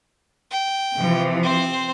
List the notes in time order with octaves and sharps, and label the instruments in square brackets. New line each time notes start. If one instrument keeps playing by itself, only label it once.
[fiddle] G5
[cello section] C3 E3 F3
[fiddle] C4 C5